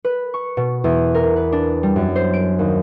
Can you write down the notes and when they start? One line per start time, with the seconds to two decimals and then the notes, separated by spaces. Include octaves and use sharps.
0.05 B4
0.34 C#6
0.57 B2
0.84 E2
1.15 A#4
1.36 B4
1.52 D4
1.83 G3
1.96 F#2
2.16 C5
2.33 D7
2.59 D#2